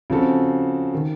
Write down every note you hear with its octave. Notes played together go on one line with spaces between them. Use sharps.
C#3 F3 C4 F#4 A4
D#3